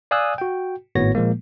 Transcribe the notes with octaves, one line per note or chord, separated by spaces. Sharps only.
D5 F5 G#5 D#6 E6 F#6
F#4 G5
G#1 A2 B3 F#4 C#5 A#6
A#2 F3 G#3 A#3